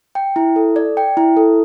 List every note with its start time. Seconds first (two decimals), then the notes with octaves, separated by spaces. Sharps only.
0.15 G5
0.36 E4
0.56 A4
0.76 D5
0.97 G5
1.17 E4
1.37 A4